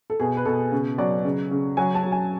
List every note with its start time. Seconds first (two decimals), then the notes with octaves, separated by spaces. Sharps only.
0.10 A4
0.20 B2 G#4
0.37 B4
0.45 B2 A4
0.72 C#3
0.98 F#3 D5
1.25 C#3
1.51 C#3
1.77 F#3 G#5
1.95 A5
2.03 F#3
2.12 G#5